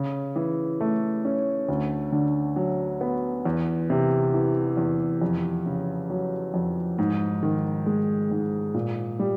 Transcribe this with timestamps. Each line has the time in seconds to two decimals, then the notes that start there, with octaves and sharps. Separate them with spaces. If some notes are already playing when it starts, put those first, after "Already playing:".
Already playing: C#3
0.36 E3
0.81 A3
1.25 C#4
1.68 D2
2.12 D3
2.56 F#3
3.01 B3
3.45 E2
3.90 C3
4.34 E3
4.77 E2
5.22 F2
5.66 C#3
6.10 F#3
6.54 F2
6.98 G#2
7.43 D#3
7.86 G#3
8.31 G#2
8.74 A#2
9.19 G3